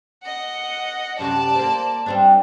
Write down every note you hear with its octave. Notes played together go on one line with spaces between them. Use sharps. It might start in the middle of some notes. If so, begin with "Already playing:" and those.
D#5 F#5
F#2 C3 F#4 D5 A5
A#3 C5
G3 C4 D4